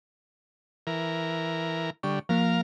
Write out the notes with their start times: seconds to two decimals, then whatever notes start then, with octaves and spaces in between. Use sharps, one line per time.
0.87 E3 A#4
2.03 D3 G3 C#6
2.29 F3 A#3 A#4 F5